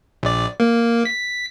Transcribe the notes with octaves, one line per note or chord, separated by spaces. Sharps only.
A#1 D5
A#3
B6